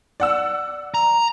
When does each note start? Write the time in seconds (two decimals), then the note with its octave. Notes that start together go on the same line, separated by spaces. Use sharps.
0.20 D5 F#5 E6
0.95 A#5